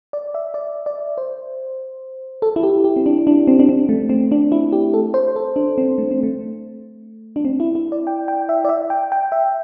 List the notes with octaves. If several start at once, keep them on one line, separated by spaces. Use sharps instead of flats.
D5
E5
D5
D5
C5
A4
E4
G4
G4
C4
D4
D4
C4
D4
C4
A3
C4
D4
E4
G4
A4
C5
A4
D4
C4
A3
C4
A3
D4
C4
E4
E4
D5
G5
G5
E5
D5
E5
G5
G5
E5